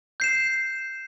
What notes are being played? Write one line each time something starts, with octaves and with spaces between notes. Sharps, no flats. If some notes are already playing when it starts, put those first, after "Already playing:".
G6 C7 E7